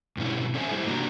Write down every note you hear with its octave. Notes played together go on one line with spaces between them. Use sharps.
G2 B2 C#4 E4
C#4 A4 C5 E5 G#5
G3 A3 E4 C5
G2 C3 A#3 D4 F#4 A#5